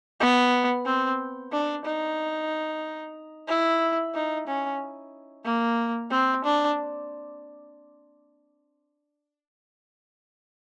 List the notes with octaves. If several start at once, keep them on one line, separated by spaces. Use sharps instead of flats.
B3
C4
D4
D#4
E4
D#4
C#4
A#3
C4
D4